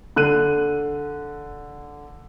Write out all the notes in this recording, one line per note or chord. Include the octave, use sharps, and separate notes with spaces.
D3 F#6 D#7